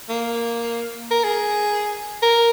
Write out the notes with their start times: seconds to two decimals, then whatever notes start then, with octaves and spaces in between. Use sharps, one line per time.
0.09 A#3
1.11 A#4
1.24 G#4
2.22 A#4